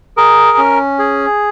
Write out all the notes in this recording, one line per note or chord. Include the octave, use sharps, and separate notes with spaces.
G#4 A#4
C#4
G#4